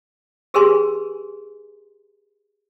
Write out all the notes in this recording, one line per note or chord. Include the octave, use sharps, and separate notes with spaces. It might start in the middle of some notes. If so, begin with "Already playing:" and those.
G4 G#4 A#4 B4 G#5 C6